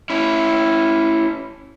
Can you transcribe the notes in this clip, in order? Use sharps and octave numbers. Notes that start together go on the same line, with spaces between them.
C#4 E4